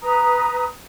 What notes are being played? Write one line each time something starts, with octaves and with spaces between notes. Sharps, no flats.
B4 A#5 D#6